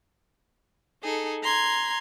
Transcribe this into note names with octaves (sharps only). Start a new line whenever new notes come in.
D#4 G#4 A4
A#5 C6 G#6